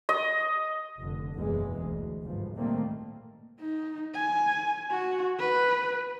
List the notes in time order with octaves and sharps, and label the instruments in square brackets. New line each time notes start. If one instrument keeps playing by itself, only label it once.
[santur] D#5
[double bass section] F1 D3
F#1 E2 B2 E3 G#3
D2
G1 G#2 B2 F3
A#2 D#3 G3 A3 A#3 C4
[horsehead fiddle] D#4
G#5
F#4
B4